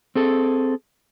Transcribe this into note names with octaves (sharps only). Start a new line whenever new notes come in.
C4 G#4 A4